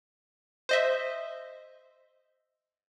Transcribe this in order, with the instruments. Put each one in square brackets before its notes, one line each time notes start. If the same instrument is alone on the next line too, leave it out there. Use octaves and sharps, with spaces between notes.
[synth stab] C5 D#5 E5